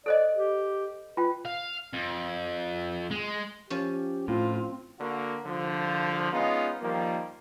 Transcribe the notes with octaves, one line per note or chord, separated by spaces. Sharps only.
A4 C5 D5 D#5
G4
F4 B4 G5
F5
F2
G#3
F3 C#4 G4
A2 C4 F4
D3 A#3 F#4
C2 D3 F3
G#3 B3 C#4 D#4 F4
D#3 F3 G3 A#3